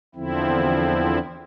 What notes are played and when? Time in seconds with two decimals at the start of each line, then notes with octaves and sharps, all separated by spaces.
0.15 E2 D3 F3 C4 E4